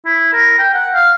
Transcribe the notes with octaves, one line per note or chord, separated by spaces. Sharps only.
E4
A#4
G5
F#5
F5